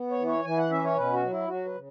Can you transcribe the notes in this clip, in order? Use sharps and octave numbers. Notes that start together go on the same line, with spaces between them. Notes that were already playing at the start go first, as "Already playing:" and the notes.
Already playing: B3
C#5
E3
C#5
E3 G#5
F#5
C#4 E5
C#5
B2 B4
F#4
F#3
E4
F#3 F#4
B4
C#3